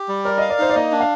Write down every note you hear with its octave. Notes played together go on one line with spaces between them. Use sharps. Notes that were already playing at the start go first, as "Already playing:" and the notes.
Already playing: G4
G3
A#4 D5
D#5 F5
D5
D#4 C5
D5
A#3 D#5
D4
F5